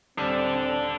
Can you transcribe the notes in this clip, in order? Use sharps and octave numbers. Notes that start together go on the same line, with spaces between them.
D#1 G3 C4 D4 A4